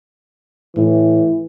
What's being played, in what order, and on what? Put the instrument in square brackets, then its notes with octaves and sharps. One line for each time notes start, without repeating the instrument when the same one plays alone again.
[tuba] A2 [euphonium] E3